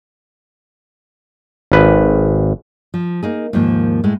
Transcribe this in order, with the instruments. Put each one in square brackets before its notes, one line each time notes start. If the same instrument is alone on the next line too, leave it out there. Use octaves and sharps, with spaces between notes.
[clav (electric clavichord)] G#1 B4
[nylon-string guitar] F3
A#3 D#4 G#4
D#2 G#2 F3 A#3
A2 G#3